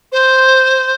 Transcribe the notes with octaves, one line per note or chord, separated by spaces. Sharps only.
C5